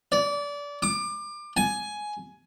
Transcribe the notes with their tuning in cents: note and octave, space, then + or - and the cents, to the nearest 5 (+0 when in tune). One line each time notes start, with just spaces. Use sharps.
D5 -25
D6 +25
G#5 +10